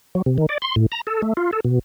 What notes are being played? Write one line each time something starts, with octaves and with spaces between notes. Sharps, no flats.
F#3
C3
D#3
D5
C6
A2
A#5
A4
A3
F4
A4
B2